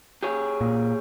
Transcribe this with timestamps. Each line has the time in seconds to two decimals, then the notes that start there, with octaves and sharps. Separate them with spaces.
0.23 G4 G#4 C#5
0.61 A#2